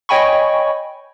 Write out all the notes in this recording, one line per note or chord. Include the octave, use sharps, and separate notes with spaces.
C#5 D#5 G5 G#5 B5 C#6